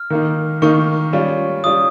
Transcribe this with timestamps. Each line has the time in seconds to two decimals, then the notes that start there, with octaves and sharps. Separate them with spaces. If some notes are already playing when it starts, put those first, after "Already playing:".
Already playing: F6
0.10 D#3 A#3 D#4
0.62 D#3 A#3 D#4 C#6
1.13 G3 C#4 F4
1.64 G3 C#4 F4 D#6